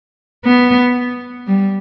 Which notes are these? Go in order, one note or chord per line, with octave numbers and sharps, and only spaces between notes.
B3
G3